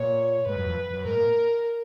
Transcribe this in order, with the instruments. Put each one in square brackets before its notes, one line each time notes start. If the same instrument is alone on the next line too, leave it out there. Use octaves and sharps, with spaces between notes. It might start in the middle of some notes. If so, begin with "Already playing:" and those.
Already playing: [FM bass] A#2 [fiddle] C#5
[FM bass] G#2 [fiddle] B4
[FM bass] F#2
F2
F#2
[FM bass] G#2 [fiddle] A#4
[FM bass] A#2